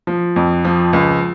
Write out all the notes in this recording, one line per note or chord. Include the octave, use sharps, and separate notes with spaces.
F3
F2
F3
C#2